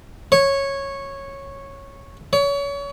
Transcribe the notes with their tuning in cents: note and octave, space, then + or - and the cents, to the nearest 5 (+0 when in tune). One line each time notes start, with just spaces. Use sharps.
C#5 -10
C#5 +30